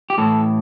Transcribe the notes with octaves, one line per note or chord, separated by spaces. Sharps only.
G4
A2 E3 A4